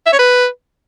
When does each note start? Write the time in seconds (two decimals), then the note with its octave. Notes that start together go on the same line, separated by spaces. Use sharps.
0.06 E5
0.13 C#5
0.19 B4